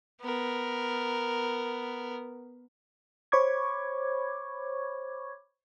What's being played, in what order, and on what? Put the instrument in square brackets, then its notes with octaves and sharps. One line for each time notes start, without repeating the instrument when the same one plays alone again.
[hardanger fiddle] B3 A#4
[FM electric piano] C5 C#5 B5 C#6 D6 G#6